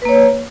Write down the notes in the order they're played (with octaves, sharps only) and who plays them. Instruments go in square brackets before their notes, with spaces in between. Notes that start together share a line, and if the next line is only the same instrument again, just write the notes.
[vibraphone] B4
A#3
C#5